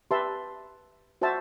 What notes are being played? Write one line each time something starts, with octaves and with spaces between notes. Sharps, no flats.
G4 B4 E5 A5 C6
F#4 C5 E5 A5